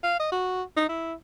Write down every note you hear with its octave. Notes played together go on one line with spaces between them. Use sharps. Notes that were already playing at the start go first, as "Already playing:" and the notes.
F5
D#5
F#4
D#4
E4